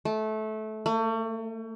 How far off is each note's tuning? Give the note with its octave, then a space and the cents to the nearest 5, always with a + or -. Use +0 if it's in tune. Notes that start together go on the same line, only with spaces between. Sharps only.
A3 -20
A3 +40